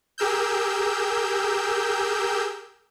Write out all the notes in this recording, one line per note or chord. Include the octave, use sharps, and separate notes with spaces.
G4 G#4 A#4 E6 G6